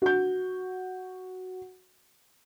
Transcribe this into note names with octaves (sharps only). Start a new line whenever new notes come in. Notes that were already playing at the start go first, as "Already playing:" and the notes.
F#4 G6